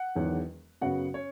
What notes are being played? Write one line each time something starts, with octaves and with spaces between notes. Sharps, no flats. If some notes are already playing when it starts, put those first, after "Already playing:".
Already playing: F#5
E1 E2 D#3 F#3
F#2 C#3 F#3 B3 F#4 F#5
C#4 C#5